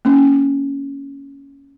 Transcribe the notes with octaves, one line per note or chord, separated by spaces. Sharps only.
A#3 C#4